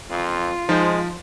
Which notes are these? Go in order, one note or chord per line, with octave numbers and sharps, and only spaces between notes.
F2 F4
F3 G#3 D#4 C5